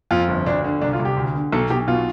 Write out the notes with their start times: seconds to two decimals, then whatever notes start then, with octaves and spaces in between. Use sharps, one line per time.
0.11 F2 F4
0.29 G1
0.46 D2 D4
0.64 D3
0.81 C2 D4
0.93 F4
0.99 C2
1.05 G4
1.17 D2
1.35 D3
1.53 B1 A4
1.70 B1 G4
1.88 B2 F4